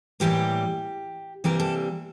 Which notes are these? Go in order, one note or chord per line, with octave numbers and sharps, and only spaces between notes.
A2 E3 G3 A#3 G4
C3 E3 G3 A#3 A#4
A4